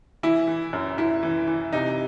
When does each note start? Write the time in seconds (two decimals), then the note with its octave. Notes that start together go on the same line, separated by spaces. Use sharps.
0.23 E3 E4
0.48 E3
0.73 F#2
0.98 F#2 E4
1.23 E3
1.47 E3
1.72 C3 D#4